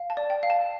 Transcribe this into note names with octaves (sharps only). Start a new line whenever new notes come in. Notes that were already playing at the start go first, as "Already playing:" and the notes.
Already playing: F5
A5
D5
G5
F5
A5